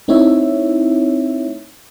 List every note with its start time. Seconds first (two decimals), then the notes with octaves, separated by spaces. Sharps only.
0.08 A3 C4 D#4 E4 C#5 E5